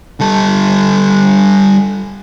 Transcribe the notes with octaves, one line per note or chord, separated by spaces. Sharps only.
G3 A4